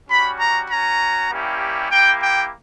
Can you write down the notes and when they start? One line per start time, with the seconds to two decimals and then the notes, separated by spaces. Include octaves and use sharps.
0.09 G3 C#4 F#4 B5
0.39 A#5
0.70 C#4 F#4 A#5
1.30 G3 A#3 C#4 E4 G4
1.91 A#3 E4 G4 G5
2.22 G5